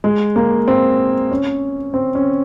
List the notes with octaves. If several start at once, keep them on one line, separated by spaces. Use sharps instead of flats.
G#3
A#3
C4
C#4
C4
C#4